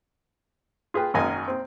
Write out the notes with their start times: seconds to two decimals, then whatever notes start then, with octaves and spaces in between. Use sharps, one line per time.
0.94 F4 G#4 B4 G5
1.14 G#1 F#2 A#3 D#5 F5 G#5
1.48 C4